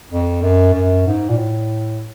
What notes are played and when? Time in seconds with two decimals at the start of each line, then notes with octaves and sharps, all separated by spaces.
0.11 F2
0.42 F#2
0.74 F#2
1.07 G#2
1.29 A#2
1.38 A2